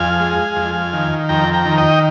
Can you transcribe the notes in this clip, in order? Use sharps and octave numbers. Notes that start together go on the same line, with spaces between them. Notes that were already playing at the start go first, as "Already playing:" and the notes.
Already playing: F2 F5 G#5
G#3
F2
D#3
F2 G5 A#5
G5 A#5
D#3
D#5 G5